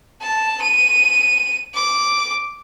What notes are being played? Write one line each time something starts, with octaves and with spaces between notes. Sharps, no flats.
A5
D#7
D6